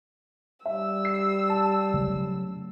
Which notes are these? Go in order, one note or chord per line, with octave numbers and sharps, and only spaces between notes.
G3 E5 E6
C7
A5
C#3 F#3 A3